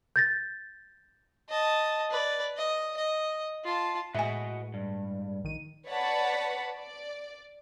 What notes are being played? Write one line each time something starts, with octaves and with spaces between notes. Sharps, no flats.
G6 A6 A#6
D#5 A5
B4 D5
D#5
D#5
F4 A5
A2 G#3 F#4 B4 D#5 E5 G#5
G2
A#1 D#3 D#7
B4 C#5 D5 F#5 A5 B5
D5